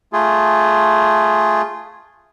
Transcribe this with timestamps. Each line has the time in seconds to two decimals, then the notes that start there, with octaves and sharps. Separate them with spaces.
0.13 A3 F4 G#4